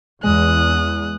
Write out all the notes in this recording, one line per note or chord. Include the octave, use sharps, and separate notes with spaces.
E2 G#3 D#6 F#6